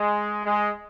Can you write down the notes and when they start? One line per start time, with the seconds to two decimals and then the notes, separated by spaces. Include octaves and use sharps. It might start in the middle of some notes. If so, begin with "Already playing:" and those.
Already playing: G#3
0.45 G#3